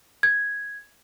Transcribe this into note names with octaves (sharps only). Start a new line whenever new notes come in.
G#6